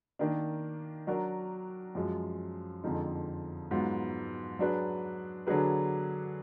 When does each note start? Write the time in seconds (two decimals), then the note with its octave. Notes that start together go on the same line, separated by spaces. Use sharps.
0.19 D#3 A#3 D4
1.07 F#3 D4 F#4 A#4
1.95 F#2 F3 G#3
2.84 F2 D3 F3 G#3 D#4
3.71 G#2 F#3 B3 F4
4.59 F#3 D4 G#4 B4
5.47 D3 F#3 D4 G#4 B4